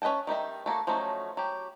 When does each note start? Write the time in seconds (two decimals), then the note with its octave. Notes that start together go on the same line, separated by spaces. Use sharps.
0.02 C#4 B4 D#5 G5 A5
0.27 D#3 G3 D#4 E5
0.66 A3 A#3 F#4 A4
0.87 F3 F#3 A3 C#4 D#4
1.37 F#3 G4